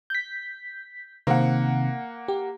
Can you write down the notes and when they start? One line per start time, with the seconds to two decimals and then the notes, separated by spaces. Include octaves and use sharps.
0.10 G6 B6
1.27 C3 D#3 A#3 C4 F#5
2.28 G4